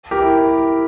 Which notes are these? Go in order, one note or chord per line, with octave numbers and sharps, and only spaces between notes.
G4 A#4
E4